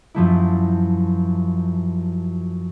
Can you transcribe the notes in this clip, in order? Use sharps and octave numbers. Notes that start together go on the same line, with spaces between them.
F#2 F3 A3 E4